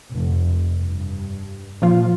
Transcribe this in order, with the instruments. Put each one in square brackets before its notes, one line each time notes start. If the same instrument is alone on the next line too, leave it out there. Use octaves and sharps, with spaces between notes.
[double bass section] F1
G2
[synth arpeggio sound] A#2 F3 F4